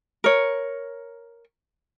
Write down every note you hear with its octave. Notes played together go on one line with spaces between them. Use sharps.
A#4 C#5